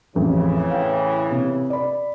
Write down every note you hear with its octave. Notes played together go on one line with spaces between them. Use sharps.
A1 F2 A2 C#3 E3
F5 G5
C3
D5 B5